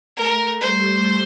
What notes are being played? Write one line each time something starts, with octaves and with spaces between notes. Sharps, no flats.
A3 A#4
G3 C5